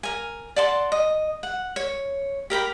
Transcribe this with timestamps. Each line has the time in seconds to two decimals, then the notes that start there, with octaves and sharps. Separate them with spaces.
0.03 A#4 G#5
0.56 D5 F#5 A5 C6
0.92 D#5
1.43 F#5
1.76 C#5
2.50 G4 A#4 G5 B5